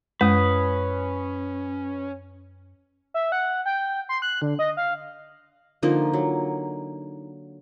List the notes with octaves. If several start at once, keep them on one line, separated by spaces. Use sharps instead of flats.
F#2 G#3 C#4 B4 D#6
E5
F#5
G5
C6
F#6
D3
D#5
F5
D3 F3 A#3 D#4
F#3